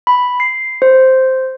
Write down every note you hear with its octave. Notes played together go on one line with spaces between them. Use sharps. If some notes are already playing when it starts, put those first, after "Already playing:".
B5
C7
C5